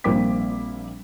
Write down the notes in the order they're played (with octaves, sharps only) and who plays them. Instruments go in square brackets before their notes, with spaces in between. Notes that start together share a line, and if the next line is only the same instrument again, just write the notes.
[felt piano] A#1 G3 A#3 C4 D6 B6